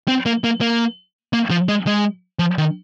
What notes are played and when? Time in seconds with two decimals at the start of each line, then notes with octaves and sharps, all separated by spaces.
0.08 C4
0.26 A#3
0.44 A#3
0.61 A#3
1.33 A#3
1.50 F3
1.68 G#3
1.87 G#3
2.39 F3
2.58 D#3